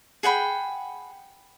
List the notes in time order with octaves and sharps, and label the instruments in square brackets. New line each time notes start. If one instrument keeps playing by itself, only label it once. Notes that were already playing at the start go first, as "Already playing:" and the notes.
[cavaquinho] G#4 F#5 G5 B5